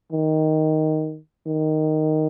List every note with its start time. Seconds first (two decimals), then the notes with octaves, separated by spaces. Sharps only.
0.12 D#3
1.47 D#3